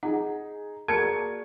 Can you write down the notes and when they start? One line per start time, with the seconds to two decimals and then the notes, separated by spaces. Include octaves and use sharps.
0.03 D#4 G#4 F#5
0.88 A#3 F#4 G#4 D5 A5 G#6 C#7